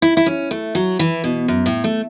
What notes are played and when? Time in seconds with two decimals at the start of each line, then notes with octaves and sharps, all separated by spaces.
0.02 E4
0.17 E4
0.26 C#4
0.51 A3
0.75 F#3
0.99 E3
1.24 B2
1.48 F#2
1.66 A2
1.84 A3